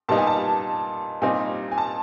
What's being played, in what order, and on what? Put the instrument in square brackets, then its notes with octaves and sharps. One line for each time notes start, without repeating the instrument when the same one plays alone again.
[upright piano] A#2 G3 B3 D#4 A5
G#5
A5
A#2 G3 C4 D#4 G#5
G#5
A5